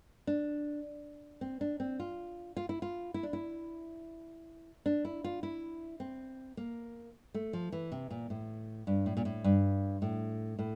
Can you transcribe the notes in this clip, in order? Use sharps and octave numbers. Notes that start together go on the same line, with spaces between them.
D4
C4
D4
C4
F4
F4
E4
F4
E4
D4
E4
D4
E4
F4
E4
C4
A#3
A3
F3
E3
C3
A#2
A2
G2
A2
A#2
A2
G2
A2
A2